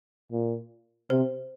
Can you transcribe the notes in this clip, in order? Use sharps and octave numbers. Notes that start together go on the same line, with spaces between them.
A#2
C3 C5